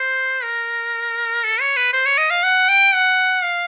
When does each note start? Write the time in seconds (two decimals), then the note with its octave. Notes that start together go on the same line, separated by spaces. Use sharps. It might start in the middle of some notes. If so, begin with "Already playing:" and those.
Already playing: C5
0.43 A#4
1.44 A4
1.61 C#5
1.77 B4
1.93 C5
2.06 C#5
2.18 D#5
2.30 F5
2.43 F#5
2.69 G5
2.94 F#5
3.43 F5